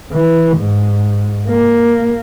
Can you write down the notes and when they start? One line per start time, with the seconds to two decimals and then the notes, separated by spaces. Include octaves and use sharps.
0.12 E3
0.58 G#2
1.49 A#3